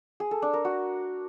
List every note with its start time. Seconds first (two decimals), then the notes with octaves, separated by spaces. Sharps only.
0.20 G#4
0.31 A4
0.42 D4
0.53 A#4
0.65 F#4